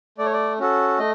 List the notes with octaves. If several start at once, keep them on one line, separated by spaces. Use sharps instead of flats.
A3 D5
C#5
D5
C#4 F#4 A4
A3 D#5